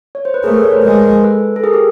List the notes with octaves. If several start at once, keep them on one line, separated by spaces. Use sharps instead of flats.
C#5
C5
B4
A3 G#4 A#4
A4 B4
B4 C#5
A#4 C5
G#3 A#4 C5
A4 B4
A4
G#4 A#4
G4 A4